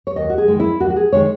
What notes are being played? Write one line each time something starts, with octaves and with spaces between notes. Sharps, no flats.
C#5
D#2 D#5
F#4
G#4
D#3 G#3
E4
D#2 F#4
F#4
G#4
D#3 G#3 C#5